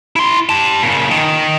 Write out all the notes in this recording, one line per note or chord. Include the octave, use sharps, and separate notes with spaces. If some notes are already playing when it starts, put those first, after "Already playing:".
E4 C6
G4 A5
A#2 C#3
D#3